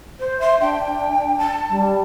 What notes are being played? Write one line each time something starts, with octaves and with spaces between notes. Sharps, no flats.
C5
E5 C6
D4 G5
A5
G3